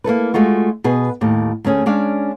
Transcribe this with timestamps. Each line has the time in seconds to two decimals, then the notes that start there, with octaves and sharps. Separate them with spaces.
0.04 A#3 E4 A4 B4
0.34 G#3 A3 F4 F#4
0.84 B2 G#4 B4
1.21 D#2 A2 G4
1.64 D2 A3 C#4 G#4
1.86 G#3 C#4 D4 D5 F5